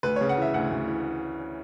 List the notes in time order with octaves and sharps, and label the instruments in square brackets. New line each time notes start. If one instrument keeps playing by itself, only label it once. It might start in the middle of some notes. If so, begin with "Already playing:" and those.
[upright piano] D2 B4
C#3 C#5
F#5
E3 E5
D2 F#5
D2
E3